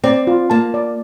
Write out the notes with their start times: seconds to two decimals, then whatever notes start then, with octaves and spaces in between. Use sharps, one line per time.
0.04 C4 D5
0.27 F4
0.50 A#3 A5
0.74 D5